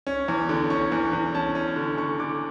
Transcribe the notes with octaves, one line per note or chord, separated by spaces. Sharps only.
C#4
E2
D3
C#4 C#6
E2
E2
C#4 A5
C#4
D3
D3 C#6
D3 D6